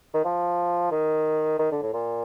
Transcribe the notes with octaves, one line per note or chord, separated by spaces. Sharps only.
D#3
F3
D#3
D#3
D3
A2
A#2